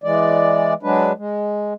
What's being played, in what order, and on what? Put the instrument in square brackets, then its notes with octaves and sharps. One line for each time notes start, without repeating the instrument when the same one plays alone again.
[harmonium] E3 G#3 D5
F#3 G#3 D4 B4
G#3